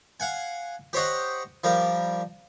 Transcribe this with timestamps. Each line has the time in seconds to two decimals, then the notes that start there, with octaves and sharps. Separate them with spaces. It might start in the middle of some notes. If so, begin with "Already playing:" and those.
0.20 F5 F#5 G#5
0.93 G4 C5 C#5 D#5 F#5
1.64 F3 G3 A#4